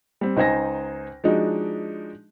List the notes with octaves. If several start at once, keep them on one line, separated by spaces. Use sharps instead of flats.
G3 C4
C#2 D#4 C5 G#5 A#6
F3 G#3 D4 D#4 F#4